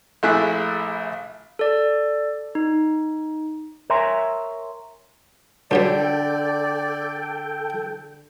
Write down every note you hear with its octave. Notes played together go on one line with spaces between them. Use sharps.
A#1 A3 E4 G#4 F#6
A4 D5
D#4
A#4 C#5 E5 G#5 A#5 C6
C#2 F#2 D3 G3 A4 D5 G5